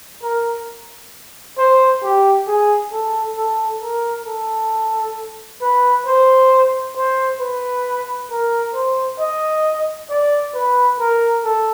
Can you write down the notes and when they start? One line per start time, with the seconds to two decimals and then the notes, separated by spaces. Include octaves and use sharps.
0.23 A#4
1.58 C5
2.03 G4
2.47 G#4
2.92 A4
3.37 A4
3.82 A#4
4.26 A4
5.61 B4
6.06 C5
6.96 C5
7.40 B4
8.31 A#4
8.75 C5
9.20 D#5
10.10 D5
10.54 B4
10.99 A#4
11.44 A4